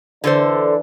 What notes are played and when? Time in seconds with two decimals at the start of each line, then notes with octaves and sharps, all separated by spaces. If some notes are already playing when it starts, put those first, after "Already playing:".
0.24 D3 E3 D4 A4 C5